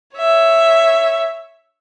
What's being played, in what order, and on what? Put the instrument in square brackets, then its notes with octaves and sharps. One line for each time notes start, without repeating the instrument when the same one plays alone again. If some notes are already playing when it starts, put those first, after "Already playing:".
[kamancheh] C#5 E5